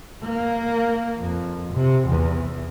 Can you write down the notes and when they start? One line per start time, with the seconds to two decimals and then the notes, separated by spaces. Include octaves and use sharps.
0.24 A#3
1.19 F2
1.73 C3
2.08 E2